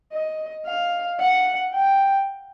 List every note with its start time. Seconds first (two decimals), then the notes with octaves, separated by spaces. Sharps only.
0.12 D#5
0.66 F5
1.20 F#5
1.73 G5